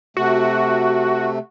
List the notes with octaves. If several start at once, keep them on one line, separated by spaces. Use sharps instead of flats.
C3 A3 F#4